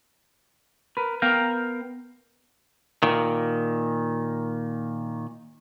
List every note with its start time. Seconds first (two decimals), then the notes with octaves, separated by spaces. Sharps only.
0.97 A#4 B4
1.22 B3 A#4 F5 G5 A#5
3.03 A#2 D#3